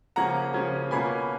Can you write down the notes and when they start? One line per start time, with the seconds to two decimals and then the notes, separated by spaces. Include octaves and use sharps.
0.16 C#3 F3 A#3 C#4 F#5 A#5
0.54 C#3 F3 A#3 C#4
0.91 B2 A#3 C#4 G#5 B5